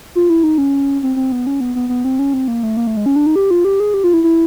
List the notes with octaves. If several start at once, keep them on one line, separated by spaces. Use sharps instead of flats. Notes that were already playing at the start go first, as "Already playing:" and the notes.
F4
E4
D#4
C#4
C4
C4
B3
C#4
B3
B3
B3
C4
C#4
C4
A#3
A3
A#3
A3
G#3
C#4
D4
D#4
G4
F4
G4
G#4
G4
F4
E4
E4